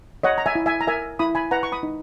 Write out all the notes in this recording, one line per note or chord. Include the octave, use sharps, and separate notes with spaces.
C#5 D#5 F#5
A#5
E5 G#5
E4
E5 G#5
A#5
A#4 E5 G#5
E4 B5 D#6
G#5 B5
B4 F#5 A#5
C#6
B5 D#6
D#4